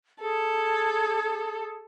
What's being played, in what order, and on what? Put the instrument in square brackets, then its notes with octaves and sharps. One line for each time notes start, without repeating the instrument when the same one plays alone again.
[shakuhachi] G#4 [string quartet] A4